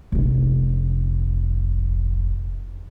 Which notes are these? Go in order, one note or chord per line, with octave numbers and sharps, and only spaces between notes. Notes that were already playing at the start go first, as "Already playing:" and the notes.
F1 A#1